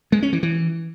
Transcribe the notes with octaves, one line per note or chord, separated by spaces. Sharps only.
G#3
C#4
E3
E3